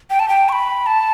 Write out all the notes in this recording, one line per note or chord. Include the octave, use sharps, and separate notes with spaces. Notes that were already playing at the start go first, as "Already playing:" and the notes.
G5
A5
G5
C#6
B5
A5